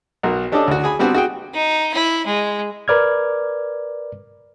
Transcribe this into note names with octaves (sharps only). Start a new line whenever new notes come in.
B1 F#4 A#4
C#4 D4 G4 A4 D5 D#5
D2 F#4
G#4 G#5 B5
G3 B3 C4 D4 F#4
F#4 G#4 G5
D#4
E4
G#3
A#4 B4 D5 F6 G#6